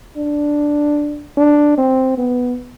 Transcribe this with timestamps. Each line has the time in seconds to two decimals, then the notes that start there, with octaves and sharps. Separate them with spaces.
0.17 D4
1.38 D4
1.78 C4
2.18 B3